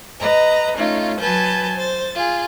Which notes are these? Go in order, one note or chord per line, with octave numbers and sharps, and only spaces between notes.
B4 D#5 A#5
A3 C#4 D#4 F4
F#3 B4 G#5 A5 G6
C5 A6
F4 G#4